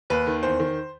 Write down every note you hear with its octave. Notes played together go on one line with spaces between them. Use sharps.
D#2 B4
D#3
E2 C5
D#3